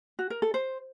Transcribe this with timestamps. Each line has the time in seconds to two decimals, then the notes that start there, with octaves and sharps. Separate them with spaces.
0.19 F#4
0.30 A#4
0.42 A4
0.54 C5